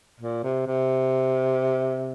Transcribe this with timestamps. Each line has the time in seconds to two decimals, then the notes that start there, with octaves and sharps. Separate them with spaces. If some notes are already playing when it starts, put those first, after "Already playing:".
0.20 A#2
0.43 C3
0.67 C3